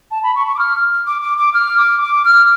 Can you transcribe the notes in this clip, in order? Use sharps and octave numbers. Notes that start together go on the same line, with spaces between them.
A5
B5
C#6
C#6
D6
F6
D6
D6
D6
F6
D6
D6
F6